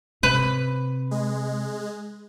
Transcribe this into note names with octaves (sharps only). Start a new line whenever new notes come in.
C3 B4
G#3